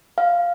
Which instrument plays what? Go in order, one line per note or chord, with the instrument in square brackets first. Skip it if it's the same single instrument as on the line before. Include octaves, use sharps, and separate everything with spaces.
[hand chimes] F5